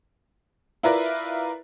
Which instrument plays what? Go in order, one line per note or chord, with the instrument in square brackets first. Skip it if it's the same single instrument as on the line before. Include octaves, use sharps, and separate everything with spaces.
[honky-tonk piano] E4 F4 A#4 B4 D5